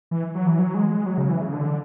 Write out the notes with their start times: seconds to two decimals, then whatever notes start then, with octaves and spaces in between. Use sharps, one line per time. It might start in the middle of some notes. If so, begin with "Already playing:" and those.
0.11 E3
0.35 F#3
0.47 E3
0.59 F#3
0.74 G#3
0.90 G#3
1.06 F#3
1.18 C#3
1.29 E3
1.41 C#3
1.52 D3